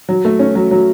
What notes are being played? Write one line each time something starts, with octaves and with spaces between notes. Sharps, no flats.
F#3
A3
C#4
F#3
F#3